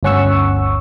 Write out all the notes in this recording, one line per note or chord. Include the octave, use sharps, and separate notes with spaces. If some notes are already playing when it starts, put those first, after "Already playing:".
G1 D2 C#4 F#5 C#6 E6